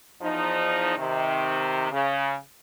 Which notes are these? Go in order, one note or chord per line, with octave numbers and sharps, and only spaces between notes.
E2 F3 D#4
C3 D#3
C#3